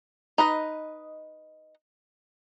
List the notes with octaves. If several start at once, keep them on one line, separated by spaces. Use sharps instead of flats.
D#4 B4 D#5